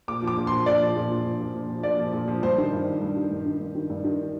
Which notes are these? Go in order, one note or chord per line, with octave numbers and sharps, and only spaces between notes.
A#2 D6
F3
D6
A#2
F3 C6
A#2 D5
F3
A#2
F3
A#2
F3
A#2
F3
A#2 D5
F3
A#2
F3
G2 C5
D#3
G2
D#3
G2
D#3
G2
D#3
G2
D#3
G2
D#3